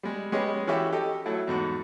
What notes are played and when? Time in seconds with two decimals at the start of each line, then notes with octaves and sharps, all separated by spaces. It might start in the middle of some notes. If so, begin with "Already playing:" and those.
0.03 G3 G#3
0.32 G#3 B3 C#4 G4 G#4 D#5
0.67 E3 C#4 F#4 G4 E5
0.92 G4 A4 D#5
1.26 F#3 A3 E4
1.47 E2 G#2 F#4